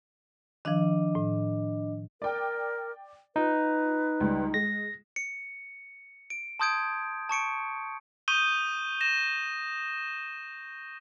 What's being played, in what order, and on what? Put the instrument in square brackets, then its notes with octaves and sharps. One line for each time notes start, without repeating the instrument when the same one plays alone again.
[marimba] D#3 F3 [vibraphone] D4 D#5
[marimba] A2
[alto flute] A#4 [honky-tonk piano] D5 G5
[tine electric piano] D#4 [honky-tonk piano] F4 [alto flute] B4
[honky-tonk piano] C#2 G3
[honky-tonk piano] G#3 [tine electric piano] A#6
[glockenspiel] C#7
D7
A5 C6 D#6 G6 G#6 D7
A5 C#6 C#7 D7
[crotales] C#6 D#6 G6 D#7 G7
A#6 E7